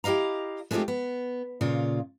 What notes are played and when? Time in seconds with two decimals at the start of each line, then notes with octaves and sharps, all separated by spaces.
0.04 E4 G4 D#5 F5 A#5
0.71 G#3 A3 C4 D#4 F4 G4
0.88 B3
1.61 A#2 C#3 F4